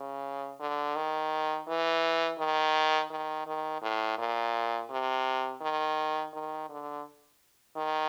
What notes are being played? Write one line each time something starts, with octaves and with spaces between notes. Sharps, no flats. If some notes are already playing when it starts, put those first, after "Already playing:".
Already playing: C#3
D3
D#3
E3
D#3
D#3
D#3
A2
A#2
C3
D#3
D#3
D3
D#3